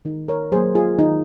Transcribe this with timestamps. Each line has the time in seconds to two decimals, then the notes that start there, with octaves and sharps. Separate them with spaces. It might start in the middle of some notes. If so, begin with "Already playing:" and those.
0.05 D#3 D#4
0.28 A#4 C#5
0.52 F#3 G#4 C5
0.56 A#3
0.75 F4 G#4
0.98 D#3 D#4